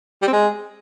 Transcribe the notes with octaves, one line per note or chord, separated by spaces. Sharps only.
G3
C4
G#3